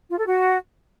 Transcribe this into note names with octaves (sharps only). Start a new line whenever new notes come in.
F4
A4
F#4